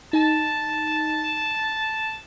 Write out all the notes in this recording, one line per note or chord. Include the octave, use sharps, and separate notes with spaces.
D#4 A5